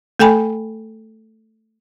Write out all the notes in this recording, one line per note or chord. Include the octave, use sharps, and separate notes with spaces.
A3 A4 G5 G#5 B5